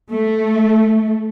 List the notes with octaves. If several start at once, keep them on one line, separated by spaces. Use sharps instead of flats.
A3